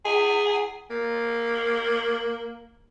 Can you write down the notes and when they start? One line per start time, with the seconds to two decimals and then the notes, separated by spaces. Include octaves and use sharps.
0.05 G#4
0.90 A#3